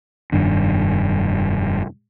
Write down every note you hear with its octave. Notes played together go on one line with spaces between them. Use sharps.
F1 G2 D#3 D4